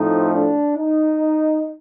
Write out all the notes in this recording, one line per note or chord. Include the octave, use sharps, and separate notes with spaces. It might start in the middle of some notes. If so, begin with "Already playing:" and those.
Already playing: A2 F3 A3 C4 D#4
D4
D#4